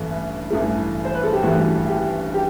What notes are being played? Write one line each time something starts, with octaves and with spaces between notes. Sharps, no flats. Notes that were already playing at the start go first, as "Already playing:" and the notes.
Already playing: A1 G2 E3 A3 E4
A1 G2 E3 A3
C5
B4
A4
G4
A1 G2 E3 A3 F#4
G4
G4